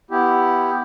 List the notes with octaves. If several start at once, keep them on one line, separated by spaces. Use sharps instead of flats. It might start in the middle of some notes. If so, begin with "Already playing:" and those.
B3 E4 G4